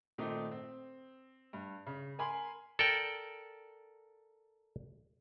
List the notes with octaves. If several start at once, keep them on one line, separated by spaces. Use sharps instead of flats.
A#2 D#3 A3 C4 D#4
C4
G2
C#3
A#4 G#5 B5 C6
A4 A#4 D5 G5